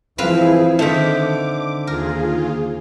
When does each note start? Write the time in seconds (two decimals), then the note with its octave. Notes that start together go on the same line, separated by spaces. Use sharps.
0.18 E3 F3 C4 E4 G#4 B4 F5
0.79 D3 D#3 A3 D4 C5 D6 B6
1.87 D#2 F4 G#4 A#4